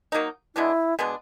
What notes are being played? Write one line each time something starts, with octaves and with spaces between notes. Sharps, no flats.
F#3 A#3 D#4
B2 G#3 B3 D4 E4
B2 G#3 B3 D4